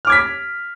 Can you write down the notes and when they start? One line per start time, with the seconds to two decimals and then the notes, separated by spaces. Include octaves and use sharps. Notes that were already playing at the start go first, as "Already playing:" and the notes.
0.05 F6
0.07 D6
0.10 G#6
0.12 B6